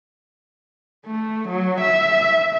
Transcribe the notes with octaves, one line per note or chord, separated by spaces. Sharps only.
A3
F#3
E5